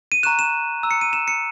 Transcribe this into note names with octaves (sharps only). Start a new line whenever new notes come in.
D#7
A#5 C#6 F#6 E7
E7
A#5 E6
C#7
D#7
E7
C#7